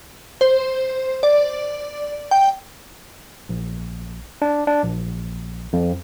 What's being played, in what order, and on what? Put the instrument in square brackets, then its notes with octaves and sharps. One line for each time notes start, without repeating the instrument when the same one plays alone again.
[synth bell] C5
D5
G5
[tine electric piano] A#1
D4
D4
A#1
F2